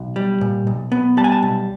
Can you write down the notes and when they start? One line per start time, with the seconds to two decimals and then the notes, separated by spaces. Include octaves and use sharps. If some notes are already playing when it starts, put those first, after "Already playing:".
Already playing: B1
0.16 G3
0.41 A#2
0.67 B1
0.92 B3
1.17 G3 A5
1.24 G#5
1.32 A5
1.43 B1